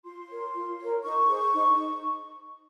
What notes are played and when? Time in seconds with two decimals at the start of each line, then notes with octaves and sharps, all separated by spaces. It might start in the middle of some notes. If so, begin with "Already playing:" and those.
0.04 F4 C6
0.29 A#4 C#5
0.54 F4
0.79 A#4 C#5
1.03 D#4 C#6
1.28 G#4 C5
1.53 D#4